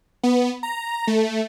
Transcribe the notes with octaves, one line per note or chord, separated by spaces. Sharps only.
B3
A#5
A3